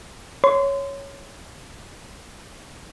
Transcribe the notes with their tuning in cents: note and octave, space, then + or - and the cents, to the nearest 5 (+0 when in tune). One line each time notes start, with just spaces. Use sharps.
C#5 +0 C6 -25